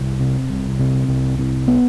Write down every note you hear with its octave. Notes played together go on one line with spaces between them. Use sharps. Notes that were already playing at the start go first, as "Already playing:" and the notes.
Already playing: C2
C3
C2
C3
C2
C3
B3